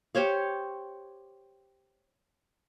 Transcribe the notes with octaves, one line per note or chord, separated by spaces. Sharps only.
G4 C5 C#5 F5